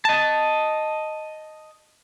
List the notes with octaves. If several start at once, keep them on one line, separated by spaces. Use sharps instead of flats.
D#5 A5